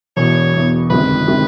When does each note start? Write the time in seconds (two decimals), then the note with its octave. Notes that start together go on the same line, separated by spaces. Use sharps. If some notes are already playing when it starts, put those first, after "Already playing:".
0.17 E1 E2 B2 C#5
0.54 E1 E2 B2
0.90 G1 F2 C3 D#3 G#3 B4
1.28 C3 D#3 G#3